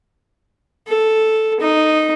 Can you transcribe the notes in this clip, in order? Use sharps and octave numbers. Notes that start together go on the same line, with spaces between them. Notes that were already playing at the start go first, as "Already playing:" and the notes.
A4
D#4